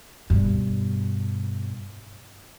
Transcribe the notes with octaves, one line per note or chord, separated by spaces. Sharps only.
G2 B2